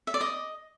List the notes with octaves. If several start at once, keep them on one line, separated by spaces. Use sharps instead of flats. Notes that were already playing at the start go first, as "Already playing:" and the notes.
E5
D5
D#5